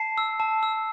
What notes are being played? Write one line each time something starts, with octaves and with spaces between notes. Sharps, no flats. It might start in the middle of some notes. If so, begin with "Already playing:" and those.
Already playing: A5 C7
E6
A5
E6